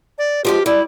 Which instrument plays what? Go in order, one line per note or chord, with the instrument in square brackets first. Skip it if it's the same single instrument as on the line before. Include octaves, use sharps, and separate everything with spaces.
[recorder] D5
[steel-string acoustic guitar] F3 G#3 F4 [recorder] G4
[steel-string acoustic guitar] G3 [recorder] E4